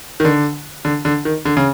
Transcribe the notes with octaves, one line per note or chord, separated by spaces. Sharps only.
D#3
D3
D3
D3
D#3
D3
C#3